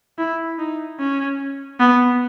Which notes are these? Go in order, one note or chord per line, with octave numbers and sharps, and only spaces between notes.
E4
D#4
C#4
B3